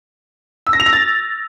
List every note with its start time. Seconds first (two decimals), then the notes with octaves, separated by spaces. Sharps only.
0.67 E6
0.73 A#6
0.80 F7
0.86 A#6
0.93 A6